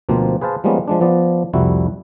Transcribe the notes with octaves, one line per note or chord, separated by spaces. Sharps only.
D2 B2 F3 A#3 C4
G#4 B4 C5 F5 A5
F3 G3 G#3 A#3 B3 C#4
F3 G#3 D4
F3 B3 D5
C2 F2 G3 E4 F#4